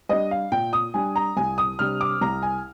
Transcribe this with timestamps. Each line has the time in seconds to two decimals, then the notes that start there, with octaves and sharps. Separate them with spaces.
0.09 G3 D4 D#5
0.31 F5
0.52 A#2 G5
0.73 D#6
0.94 G3 D4 G#5
1.16 A#5
1.37 C2 G#5
1.58 D#6
1.79 C3 G3 D4 F6
2.01 D6
2.21 C2 A#5
2.42 G#5